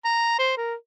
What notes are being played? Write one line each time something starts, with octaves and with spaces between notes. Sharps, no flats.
A#5
C5
A#4